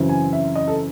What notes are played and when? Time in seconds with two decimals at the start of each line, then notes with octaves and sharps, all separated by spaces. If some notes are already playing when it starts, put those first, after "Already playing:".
Already playing: F#2 C#3 E3 C4
0.09 G#5
0.33 E5
0.56 D#5
0.68 A4